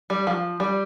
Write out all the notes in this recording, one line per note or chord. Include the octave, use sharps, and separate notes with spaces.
G3
F3
G3